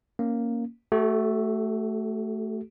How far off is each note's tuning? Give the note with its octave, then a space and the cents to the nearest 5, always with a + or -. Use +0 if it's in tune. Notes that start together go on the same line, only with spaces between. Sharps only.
A#3 +0 C#4 +0
A3 +0 F#4 +40 A4 -35